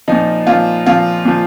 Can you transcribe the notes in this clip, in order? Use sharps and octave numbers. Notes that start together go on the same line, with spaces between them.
A#2 F3 D#4
A#2 F3 F4
A#2 F3 F4
A#2 F3